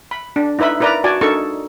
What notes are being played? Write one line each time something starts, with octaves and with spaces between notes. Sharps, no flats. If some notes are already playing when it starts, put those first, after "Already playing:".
B5
D4
D#4 E4 B4 E5 B5
E4 A#4 B4 D5 A#5
F#4 D5 G#5 A5
D4 D#4 A4 A#4 C#6